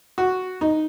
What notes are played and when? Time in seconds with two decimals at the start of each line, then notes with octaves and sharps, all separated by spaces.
0.18 F#4
0.61 D#4